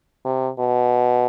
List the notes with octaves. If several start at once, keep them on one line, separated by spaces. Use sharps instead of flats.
C3
B2